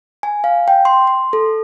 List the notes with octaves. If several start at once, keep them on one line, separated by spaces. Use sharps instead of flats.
G#5
F5
G5
C6
C6
A4